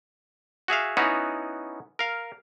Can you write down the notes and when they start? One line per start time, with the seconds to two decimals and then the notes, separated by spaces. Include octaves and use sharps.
0.68 F#4 G#4 E5 F5
0.97 B3 C#4 D#4 E4 F#4
1.99 A#4 F5